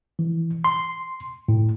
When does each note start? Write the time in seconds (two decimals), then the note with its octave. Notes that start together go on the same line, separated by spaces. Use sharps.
0.19 E3
0.64 C6
1.48 A2